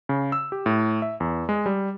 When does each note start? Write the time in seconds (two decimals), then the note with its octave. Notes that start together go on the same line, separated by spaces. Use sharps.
0.09 C#3
0.32 E6
0.52 G4
0.66 A2
1.02 E5
1.20 E2
1.49 G#3
1.66 G3